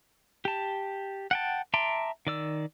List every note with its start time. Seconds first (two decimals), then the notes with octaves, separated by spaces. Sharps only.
0.45 G4 A5
1.31 F#5 G5 A5
1.74 E5 A5 A#5 C6 D6
2.27 D#3 D5 E6